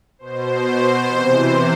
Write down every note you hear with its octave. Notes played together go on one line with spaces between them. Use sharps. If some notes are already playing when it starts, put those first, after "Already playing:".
B2 C5
C3 E3